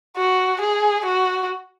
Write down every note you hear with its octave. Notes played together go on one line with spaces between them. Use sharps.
F#4
G#4
F#4